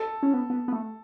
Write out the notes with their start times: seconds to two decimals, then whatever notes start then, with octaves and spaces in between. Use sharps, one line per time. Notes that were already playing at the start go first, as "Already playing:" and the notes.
Already playing: A4
0.23 C#4
0.34 B3
0.50 B3
0.68 B3
0.72 A3